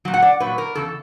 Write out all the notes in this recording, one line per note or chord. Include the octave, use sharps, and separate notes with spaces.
A#2 F#3
F#5
D5
A#2 F#3 B4
A#4
E2 C#3 A4